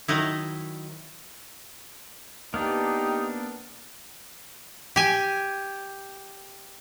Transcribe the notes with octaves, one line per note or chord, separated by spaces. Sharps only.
D#3 F#3 D#4 E4
A#3 B3 D4 D#4 G4
G4 G#5